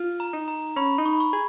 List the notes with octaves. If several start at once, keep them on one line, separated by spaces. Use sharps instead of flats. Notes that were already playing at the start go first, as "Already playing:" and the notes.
Already playing: F4
A#5
D#4
A#5
C#4 B5
D#4
C#6
B5
C#6
G#4